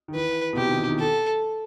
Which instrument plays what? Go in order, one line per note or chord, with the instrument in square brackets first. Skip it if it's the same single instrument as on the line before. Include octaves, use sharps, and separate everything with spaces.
[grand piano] D#3
[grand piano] E3 [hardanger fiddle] B4
[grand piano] B2
[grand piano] C3 [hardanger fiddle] G4
[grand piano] D#3
E3
D#3
[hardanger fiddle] A4